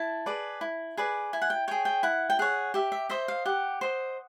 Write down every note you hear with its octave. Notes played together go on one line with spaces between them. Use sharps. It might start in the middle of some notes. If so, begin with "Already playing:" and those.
Already playing: E4 A5
G#4 B4 D5
E4
G#4 B4 D5
E4 G#5
F#5
G5
G#4 C#5 G5
G5
E4 F#5
G5
G#4 C#5 F#5
G4 E5
E5
C5 D#5 E5
F5
G4 F#5
C5 D#5